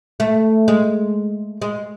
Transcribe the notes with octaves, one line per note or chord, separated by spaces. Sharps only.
A3
G#3
G#3